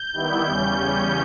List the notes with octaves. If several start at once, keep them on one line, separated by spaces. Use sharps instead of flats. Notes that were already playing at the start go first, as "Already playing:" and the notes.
Already playing: G6
D#3 G3 B3 E4
E2 C#3 G3 C#4 G6